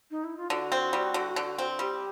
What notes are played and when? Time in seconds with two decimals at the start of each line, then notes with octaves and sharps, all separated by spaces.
0.10 D#4
0.24 E4
0.37 F4
0.50 D3 F#4
0.72 C4
0.93 G3
1.14 D3
1.36 D3
1.58 C4
1.79 G3 G4